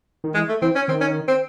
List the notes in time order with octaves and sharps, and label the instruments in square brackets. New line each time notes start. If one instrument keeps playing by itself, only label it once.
[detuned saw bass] D#3
[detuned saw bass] E3 [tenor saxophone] G#3
[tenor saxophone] A3
[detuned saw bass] E3 [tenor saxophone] C4
[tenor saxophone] C#4
[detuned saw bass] D#3 [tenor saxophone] C4
[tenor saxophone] C#4
C4